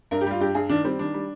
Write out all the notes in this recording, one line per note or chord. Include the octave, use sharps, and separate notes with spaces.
G2 A#4
G4
G3 F4
G2 G4
G2 G#4
D#3 D4
G3 C4
D#3 D4
G3